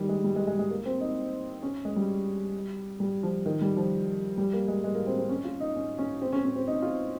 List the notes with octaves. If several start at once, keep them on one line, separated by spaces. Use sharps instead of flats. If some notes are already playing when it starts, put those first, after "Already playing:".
Already playing: D#3 G3
G#3
G3
G#3
G#3
G#3
A#3
C4
D#4
C#4
G#3
G3
G3
F3
D#3
G3
F3
G3
A#3
G#3
G#3
A#3
C4
C4
C#4
F4
D#4
C#4
C#4
C4
C#4
C#4
C4
D#4
F4